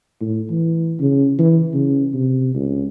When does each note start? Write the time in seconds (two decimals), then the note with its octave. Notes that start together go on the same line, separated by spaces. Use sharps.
0.21 A2
0.50 E3
1.00 C#3
1.39 E3
1.73 C#3
2.14 C3
2.54 C#2